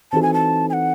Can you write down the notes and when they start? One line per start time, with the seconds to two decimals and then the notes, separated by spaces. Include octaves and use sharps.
0.12 E3 C4 D#4 F#4 A4 A5
0.22 G#5
0.34 A5
0.70 G#5
0.73 F#5